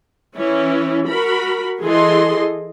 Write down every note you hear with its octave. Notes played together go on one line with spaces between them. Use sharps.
E3 C#4 E4
F#4 A#4 B5
E3 G#4 A4 D#5 C6